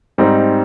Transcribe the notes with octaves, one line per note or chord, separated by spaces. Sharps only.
G#2 G3 C4 D#4